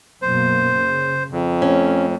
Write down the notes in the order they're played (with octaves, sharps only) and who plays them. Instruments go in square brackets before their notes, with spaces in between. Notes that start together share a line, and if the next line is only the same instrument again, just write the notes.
[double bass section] F#2 B2 A#3 [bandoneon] C5
[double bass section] C#3
[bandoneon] F2
[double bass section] A3 [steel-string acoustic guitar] C#4